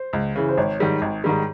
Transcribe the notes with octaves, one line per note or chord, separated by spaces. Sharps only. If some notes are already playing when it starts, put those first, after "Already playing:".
Already playing: C5
C#2
C#3 E3
C5
G#1 C#5
G#2 D#3 G3
G#1
G#2 D#3 G3